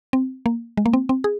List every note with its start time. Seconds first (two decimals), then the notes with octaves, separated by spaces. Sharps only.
0.13 C4
0.46 A#3
0.77 G#3
0.86 A#3
0.93 C4
1.09 C4
1.24 G#4